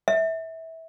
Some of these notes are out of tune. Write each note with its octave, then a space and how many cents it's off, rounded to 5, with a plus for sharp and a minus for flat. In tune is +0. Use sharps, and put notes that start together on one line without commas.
E5 -20